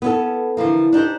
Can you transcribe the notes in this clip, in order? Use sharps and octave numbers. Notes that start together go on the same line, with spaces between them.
B3 C#4 A4
D3 E3 F3 A#3
D4 D#4 G4 C5